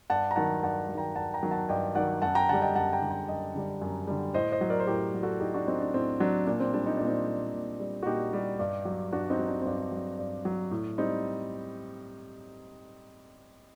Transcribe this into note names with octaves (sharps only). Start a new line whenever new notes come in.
G2 F#5 A5
A#5
D#3 F#3 F#5 A5
G2 F#5 A5
F#3
D#3 G5 A#5
G2 F#5 A5
G5 A#5
D#3 F#3
F#5 A5
G2 D#5 G5
D#3 F#3 D5 F#5
F#2 F#5 A5
G5 A#5
D3 G3 F#5 A5
D#5 G5
F#2 F#5 A5
G5 A#5
D3 G3
G5 A#5
F#2 D#5 G5
D3 G3
F#2
D3 G3
A2 C5 D#5
C5 D#5
F#3
A#4 D5
C5
A2 G4 A#4
F#3
F#4 A4
A2 D#4 G4
D4 F#4
F#3 C4 D#4
D4
A2 C4
F#3 D4
A#2 D4
C4
G3 D4
D#4
A#2 D4
C4 D#4
G3
A#2
G3
F#4
A#2 D#4 G4
G3
G2
F#3
G2 D4 F#4
C4 D#4
F#3
D4
G2 C4
D4
F#3
G2
F#3
A2
G3 C4 D#4